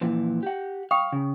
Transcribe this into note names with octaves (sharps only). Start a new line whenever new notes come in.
A#2 E3 F3
G4 F#5
F5 G5 C#6 D#6
C#3